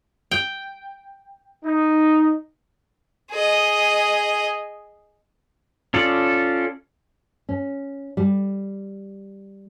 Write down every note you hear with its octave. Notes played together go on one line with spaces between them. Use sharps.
G5
D#4
G#4 D#5
C#4 F4 A4 D5
C#4
G3